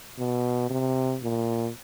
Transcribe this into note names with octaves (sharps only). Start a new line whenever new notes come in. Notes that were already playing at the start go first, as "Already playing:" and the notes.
B2
C3
A#2